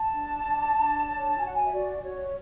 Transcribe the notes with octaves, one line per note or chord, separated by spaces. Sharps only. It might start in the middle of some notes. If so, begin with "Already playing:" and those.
Already playing: A5
D4
D4
D4
C#5
F#4 G#5
F#5
G#5
E5
F#4 D5
F#4 C#5